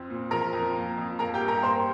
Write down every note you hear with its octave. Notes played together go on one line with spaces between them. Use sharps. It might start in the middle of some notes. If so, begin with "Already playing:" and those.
Already playing: F2 C4
A#2
F3 A#4 A#5
F2
A#3
F2
A#3 A#4 A#5
G4 G5
G2
A#4 A#5
A#3 C5 C6